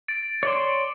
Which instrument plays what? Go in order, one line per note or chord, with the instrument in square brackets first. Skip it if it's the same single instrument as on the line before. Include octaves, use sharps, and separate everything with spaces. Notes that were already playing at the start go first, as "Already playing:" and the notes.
[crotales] A6 D7
[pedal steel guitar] C#5 D5 C6 [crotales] D6 A6